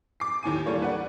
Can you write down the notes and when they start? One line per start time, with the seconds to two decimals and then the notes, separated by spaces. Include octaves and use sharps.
0.20 D6 C7
0.43 D#2 A2 G#5 D#7
0.66 D3 E3 G3 A3 A#3 C#5
0.82 B4 D5 F#5